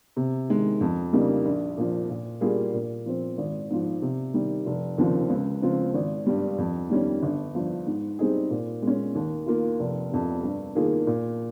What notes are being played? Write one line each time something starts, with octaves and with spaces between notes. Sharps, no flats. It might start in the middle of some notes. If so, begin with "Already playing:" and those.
C3
D#3 G#3
F2
C#3 G3 A#3 D#4
A#1
A#2 F3
A#2
G3 A#3 F4 G#4
A#2
F3 C4
G#1
G#2 F3
C3
D#3 G3
F1
D#2 C#3 F3 C4
C#2
C#3 F3 C4 F4
G#1
G2 G3
F2
D#3 G3 C#4
G1
G2 F3
G#2
G3 C4 D#4 G#4
A#2
G#3
C#4
D#2
D#3 A#3 F4
F1
F2 C3
G2
D#3 A#3 F4 G#4
A#2